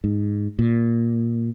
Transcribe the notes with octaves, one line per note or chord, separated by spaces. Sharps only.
G#2
A#2